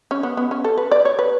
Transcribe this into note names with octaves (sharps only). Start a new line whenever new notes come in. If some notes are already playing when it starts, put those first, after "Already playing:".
C#4
B3
B3
C#4
A4
B4
D5
C#5
B4